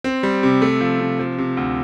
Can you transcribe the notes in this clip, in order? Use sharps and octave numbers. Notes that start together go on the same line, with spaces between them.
C4
G3
C3
A3
F3
C3
F3
C3
D2